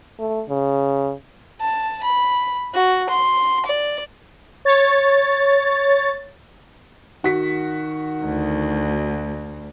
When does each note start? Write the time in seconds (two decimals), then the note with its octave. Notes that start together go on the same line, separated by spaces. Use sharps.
0.19 A3
0.49 C#3
1.60 A5
2.04 B5
2.74 F#4
3.09 C6
3.66 D5
4.65 C#5 A6
7.24 D#3 F#4 B6
8.24 D2